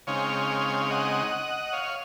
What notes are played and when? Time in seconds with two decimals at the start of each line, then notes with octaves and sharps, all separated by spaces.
0.07 C#3 G#3 C4 D#4 C#5 F5
0.86 F5
0.90 D#5 F#5
1.73 C#5 F5